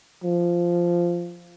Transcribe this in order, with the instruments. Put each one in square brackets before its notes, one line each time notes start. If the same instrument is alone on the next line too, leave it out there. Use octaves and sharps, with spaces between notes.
[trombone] F3